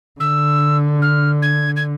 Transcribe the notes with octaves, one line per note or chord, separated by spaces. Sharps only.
D3 E6
F6
G#6
G#6